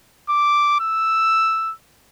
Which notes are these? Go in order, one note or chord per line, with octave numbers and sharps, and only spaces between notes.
D6
E6